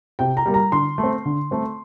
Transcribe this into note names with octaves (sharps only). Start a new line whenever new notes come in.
C3 G5
A#5
G3 A#3
A#5
D3 C6
A3
C4
D3
A3 C4